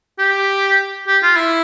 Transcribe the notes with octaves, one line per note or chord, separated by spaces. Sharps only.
G4
G4
F4
E4